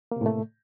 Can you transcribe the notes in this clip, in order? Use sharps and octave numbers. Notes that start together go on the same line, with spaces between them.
A2 C3 A3 A#3